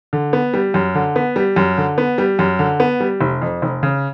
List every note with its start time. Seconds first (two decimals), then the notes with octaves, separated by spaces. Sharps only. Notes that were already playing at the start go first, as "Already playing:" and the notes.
0.13 D3
0.33 B3
0.54 G3
0.74 F#2
0.95 D3
1.16 B3
1.36 G3
1.56 F#2
1.78 D3
1.98 B3
2.18 G3
2.39 F#2
2.59 D3
2.80 B3
3.00 G3
3.21 F1
3.42 F2
3.62 F1
3.83 C#3